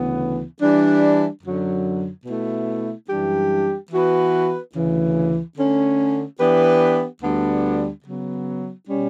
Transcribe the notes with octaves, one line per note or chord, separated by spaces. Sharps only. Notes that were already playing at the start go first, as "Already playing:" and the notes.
Already playing: D2 C#3 E3 B3
E3 G3 D4
F#2 D3 F#3
B2 A3 E4
F#2 E3 G3 D4 G4
E3 B3 F#4 B4
D2 C#3 E3
D3 A3 C#4
E3 B3 D4 G4 B4
D2 D3 G3 B3 D4
C#3 F#3 B3
B2 G3 C#4